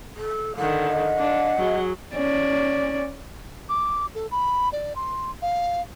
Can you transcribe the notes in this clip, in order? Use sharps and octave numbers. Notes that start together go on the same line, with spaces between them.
A4
D3 D#3 F#5
D#5
D4
F#3 G#4
C#4 D5
D6
A4
B5
D5
C6
F5